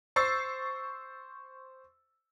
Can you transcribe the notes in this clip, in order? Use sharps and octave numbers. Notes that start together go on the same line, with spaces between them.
C5 C#6 E6 A6 C7